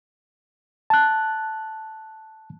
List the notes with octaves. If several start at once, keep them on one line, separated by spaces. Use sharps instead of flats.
A5 F#6